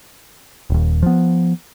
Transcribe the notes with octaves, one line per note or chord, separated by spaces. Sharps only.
D#1 D#2
F3 B3